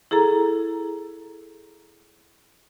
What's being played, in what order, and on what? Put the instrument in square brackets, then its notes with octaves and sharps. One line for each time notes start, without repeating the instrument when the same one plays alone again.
[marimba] E4 G#4 A4 A#5